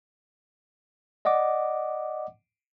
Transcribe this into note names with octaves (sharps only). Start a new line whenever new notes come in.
D5 D#5 F#5 D6